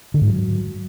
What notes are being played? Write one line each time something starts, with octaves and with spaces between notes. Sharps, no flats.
D3
G#2
F#3